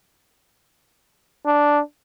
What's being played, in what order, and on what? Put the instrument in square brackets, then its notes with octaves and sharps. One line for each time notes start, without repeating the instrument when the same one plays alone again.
[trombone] D4